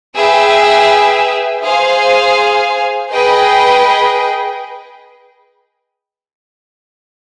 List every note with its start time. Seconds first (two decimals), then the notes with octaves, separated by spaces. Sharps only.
0.16 G#4 B4 E5 G5
1.64 G#4 C5 F5 G#5
3.12 G#4 B4 D#5 G5